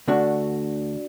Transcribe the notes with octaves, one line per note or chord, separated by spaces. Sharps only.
D2 D3 A3 D4 F#4